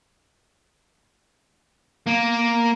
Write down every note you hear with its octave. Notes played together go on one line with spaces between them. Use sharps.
A#3